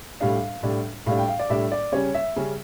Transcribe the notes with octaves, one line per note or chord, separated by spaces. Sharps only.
A2 G3 D4 F5
A2 G3 D4
A2 G3 D4 F5
G5
F5
D5
A2 G3 D4 E5
D5
C#3 G3 C#4 C#5
E5
C#3 G3 C#4